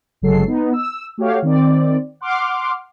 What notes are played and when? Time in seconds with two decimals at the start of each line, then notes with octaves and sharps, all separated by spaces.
0.22 G1 C#3 F#3 G#3 A4 C7
0.48 B3 D#4
0.73 E6
1.18 A3 F#4 G4 C#5 F5
1.42 D#3 C4 D5
2.21 F#5 C6 D6 F6